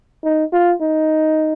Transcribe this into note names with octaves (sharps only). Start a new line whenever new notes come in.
D#4
F4
D#4